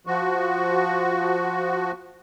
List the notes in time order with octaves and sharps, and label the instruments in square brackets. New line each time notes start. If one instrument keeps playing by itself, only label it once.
[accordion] F3 F#4